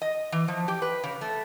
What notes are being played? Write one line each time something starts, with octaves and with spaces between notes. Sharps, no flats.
D#5
E3
F3
G4
B4
C#3
A3